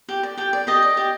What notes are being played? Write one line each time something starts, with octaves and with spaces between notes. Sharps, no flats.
G4
D5
G4 G5
D5
G4 D#5
D5
G4